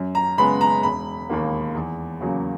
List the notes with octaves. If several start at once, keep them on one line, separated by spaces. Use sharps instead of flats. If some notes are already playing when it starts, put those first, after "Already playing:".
Already playing: F#2
A#5
C#3 G#3 B3 B5
A#5
E1 B5
D#2 D#3 A#3
E2
C#3 F#3 A#3